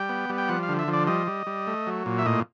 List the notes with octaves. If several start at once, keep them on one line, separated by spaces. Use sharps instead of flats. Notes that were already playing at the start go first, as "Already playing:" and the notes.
Already playing: G3 G5
B3
G3
G5
F3 F#5
F5
D3
E5
F3
D5
G3 D#5
G3
G3
A3
F#3
A#2
E5
A2 D#5